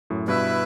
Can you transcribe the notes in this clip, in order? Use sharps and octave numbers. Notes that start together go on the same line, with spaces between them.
F#2 A2
G2 B2 E4 B4 E5